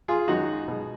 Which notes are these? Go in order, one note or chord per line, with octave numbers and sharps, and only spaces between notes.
F4 G#4
F#2 D#3 G#3 D#4 F#4
B2 G#3